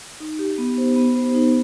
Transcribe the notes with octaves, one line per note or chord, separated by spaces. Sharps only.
D#4
G4
B3
C5
B3
C5
D#4